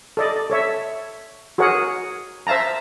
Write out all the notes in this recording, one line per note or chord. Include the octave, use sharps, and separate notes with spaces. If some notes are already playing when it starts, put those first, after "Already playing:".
A4 D5 D#5
A4 C#5 E5
F#4 G#4 A#4 C#5 F#5
C5 E5 F5 A5 A#5